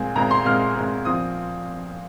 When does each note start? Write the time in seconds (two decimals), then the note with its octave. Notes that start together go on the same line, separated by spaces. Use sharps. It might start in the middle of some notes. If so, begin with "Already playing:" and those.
Already playing: A#2 G#3 C4 G#5
0.15 A#2 G#3 C4 A#5
0.31 C6
0.45 A#2 G#3 C4 F6
0.75 A#2 G#3 C4
1.05 A#2 F3 C4 D#6